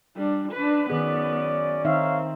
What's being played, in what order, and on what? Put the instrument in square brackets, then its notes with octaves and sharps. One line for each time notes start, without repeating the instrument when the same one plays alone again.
[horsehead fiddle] G3 D4
D4 B4
[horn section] F#2 C#4 D5 [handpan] D#3 G#4 [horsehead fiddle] B3
[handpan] D#3 D#4 E5 [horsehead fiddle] C4 [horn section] C#5 F5